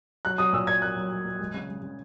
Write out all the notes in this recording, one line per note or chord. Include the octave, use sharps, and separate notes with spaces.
F#3 F#6
F#3 D#6
A#2 E6
A#2 G#6
A#3 F#6
F#3
F#3
A#2
G#3
C#3
G#3
C#3